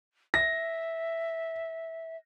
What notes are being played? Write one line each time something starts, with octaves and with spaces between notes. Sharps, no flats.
E5 A#6